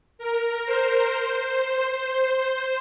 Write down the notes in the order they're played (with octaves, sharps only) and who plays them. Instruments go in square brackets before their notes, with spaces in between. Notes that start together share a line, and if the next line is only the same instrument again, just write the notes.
[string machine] A#4
C5
C5